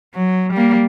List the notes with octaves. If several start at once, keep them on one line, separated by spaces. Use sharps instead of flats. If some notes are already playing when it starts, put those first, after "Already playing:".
F#3
G3 A#3